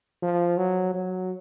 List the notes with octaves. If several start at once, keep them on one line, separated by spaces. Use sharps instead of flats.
F3
F#3
F#3